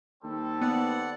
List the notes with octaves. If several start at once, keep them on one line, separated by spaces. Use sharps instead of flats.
D#2 G3 C4 A4
B3 D5 F#5